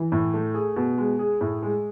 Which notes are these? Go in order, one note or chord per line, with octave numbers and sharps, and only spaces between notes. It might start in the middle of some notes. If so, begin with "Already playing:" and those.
Already playing: E3
A2
A3
G#4
B2
G#3
G#4
A2
G#3